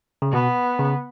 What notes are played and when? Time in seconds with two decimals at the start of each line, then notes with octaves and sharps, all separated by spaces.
0.22 C#3
0.32 B2 B3
0.79 C#3